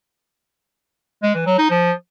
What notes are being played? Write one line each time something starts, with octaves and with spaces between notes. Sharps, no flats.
G#3
E3
F#3
D#4
F3